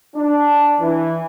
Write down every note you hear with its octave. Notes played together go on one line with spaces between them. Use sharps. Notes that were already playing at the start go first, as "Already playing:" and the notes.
D4
E3